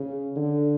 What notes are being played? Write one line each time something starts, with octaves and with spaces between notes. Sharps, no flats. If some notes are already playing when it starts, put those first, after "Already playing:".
Already playing: C#3
D3